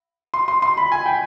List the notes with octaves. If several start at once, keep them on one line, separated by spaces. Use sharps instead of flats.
C6
C6
C6
B5
G#5
G5